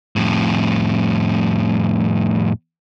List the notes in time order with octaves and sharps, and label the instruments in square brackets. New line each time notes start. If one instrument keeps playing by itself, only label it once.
[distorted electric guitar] F2 A2